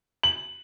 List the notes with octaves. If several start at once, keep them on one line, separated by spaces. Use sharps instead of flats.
F#7